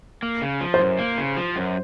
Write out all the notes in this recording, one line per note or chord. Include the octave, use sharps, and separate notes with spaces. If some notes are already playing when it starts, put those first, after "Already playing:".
A#3
C#3
F3
C5
F#2
A#3
C#3
F3
F#2